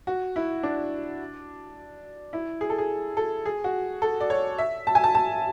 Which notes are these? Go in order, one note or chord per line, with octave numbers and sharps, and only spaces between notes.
F#4
E4
D4
E4
G#4
A4
G#4
A4
G#4
F#4
A4
D5
C#5
E5
A5
G#5
A5
A5